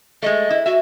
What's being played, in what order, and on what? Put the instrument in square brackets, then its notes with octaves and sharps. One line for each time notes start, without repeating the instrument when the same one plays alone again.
[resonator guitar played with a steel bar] G#3 A3 [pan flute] D#5
[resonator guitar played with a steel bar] E4
[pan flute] F#4 [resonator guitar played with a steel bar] E5